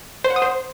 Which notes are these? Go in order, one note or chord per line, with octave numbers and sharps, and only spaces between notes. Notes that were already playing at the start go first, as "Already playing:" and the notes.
C5
F#5
D#6
C5